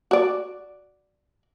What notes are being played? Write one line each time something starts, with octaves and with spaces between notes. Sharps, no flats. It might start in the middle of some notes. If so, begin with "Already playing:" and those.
F#4 D5